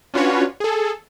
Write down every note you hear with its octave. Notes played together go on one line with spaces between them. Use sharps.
C#4 D4 F4 F#4 B4 C#5
G#4 A4